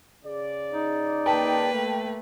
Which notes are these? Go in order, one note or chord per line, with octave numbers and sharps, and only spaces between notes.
C#3 G#4 D5
D#4
A#3 B4 G5 A5
A3